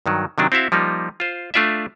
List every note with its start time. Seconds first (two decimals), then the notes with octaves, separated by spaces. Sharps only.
0.06 G2 D#3 F#3
0.38 C3 D#3 F#3 D4
0.52 C4 E4 F#4 E5 F5
0.72 F3 G3 A#3 D#4
1.20 F4 C5
1.54 A3 D4 F4 D5 E5